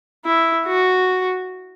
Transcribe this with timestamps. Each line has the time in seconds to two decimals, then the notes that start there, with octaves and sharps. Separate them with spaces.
0.25 E4
0.67 F#4